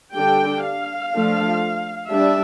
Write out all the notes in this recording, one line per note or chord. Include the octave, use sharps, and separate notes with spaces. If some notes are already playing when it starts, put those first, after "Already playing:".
D3 G3 D4 G5
F5
F3 A3 D4
G3 D4 E5